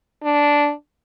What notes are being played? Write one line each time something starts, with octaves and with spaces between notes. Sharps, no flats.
D4